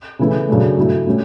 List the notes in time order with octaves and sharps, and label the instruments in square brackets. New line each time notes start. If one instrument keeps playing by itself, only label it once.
[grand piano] C#3 E3 A3 E4
F#2 C#3 F#3 A3 D4
G2 F#3 A3 E4
A2 G3 C#4